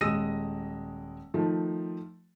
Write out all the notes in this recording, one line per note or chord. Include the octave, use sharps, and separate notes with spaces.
D#1 G#3 D#6 E6 A#6 D#7
D#3 F3 A3